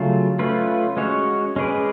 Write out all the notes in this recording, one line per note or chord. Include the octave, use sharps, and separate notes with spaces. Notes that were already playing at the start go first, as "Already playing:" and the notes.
Already playing: C#3 F#3 A3 F4
A3 C#4 F4 B4
G#3 C#4 F#4 C#5
G#3 C#4 G#4 B4 D5